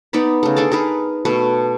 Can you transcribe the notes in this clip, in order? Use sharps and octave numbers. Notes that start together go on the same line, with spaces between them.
B3 D#4 D5 B5
C#3 A3
D4 G#4 A4 D5
D#4 G#4 A#4 B4
B2 A3 B4